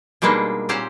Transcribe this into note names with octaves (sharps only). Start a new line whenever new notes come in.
B2 G3 G#3 A#3 D4 D#4
A#2 C4 C#4 G4 C5 F#5